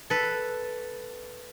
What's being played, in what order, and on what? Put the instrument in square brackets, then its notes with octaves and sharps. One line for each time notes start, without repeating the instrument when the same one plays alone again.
[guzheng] A4 B4